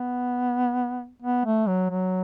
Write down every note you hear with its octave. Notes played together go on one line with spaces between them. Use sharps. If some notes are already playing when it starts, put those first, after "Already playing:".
Already playing: B3
B3
A3
F#3
F#3